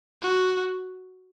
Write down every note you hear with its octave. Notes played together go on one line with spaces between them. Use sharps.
F#4